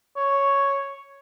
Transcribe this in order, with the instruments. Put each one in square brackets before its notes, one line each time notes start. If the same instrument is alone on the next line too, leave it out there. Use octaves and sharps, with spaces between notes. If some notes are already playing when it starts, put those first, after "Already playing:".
[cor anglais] C#5